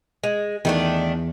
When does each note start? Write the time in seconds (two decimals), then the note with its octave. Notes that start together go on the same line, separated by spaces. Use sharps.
0.24 G#3
0.65 E2 D#3 A3 D4